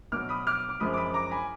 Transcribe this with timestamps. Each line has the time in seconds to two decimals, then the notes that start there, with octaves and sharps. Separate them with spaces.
0.12 B2 F#3 D6 F6
0.29 B5 D#6
0.47 D6 F6
0.69 D6
0.80 F#2 F3 G#3 B5 D#6
0.93 D6
0.97 B5 D#6
1.14 A#5 D6
1.31 G#5 B5